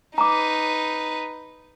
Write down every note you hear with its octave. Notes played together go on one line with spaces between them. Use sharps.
D#4 B4 A#5 D6